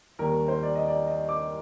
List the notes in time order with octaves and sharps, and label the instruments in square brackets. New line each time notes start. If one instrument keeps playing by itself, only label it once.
[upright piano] D#2 D#3 G3 A#4
C5
D5
D#5
D5
D#5
D6